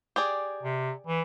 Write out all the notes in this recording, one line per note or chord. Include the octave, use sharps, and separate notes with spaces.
G4 G#4 D5
C3
E3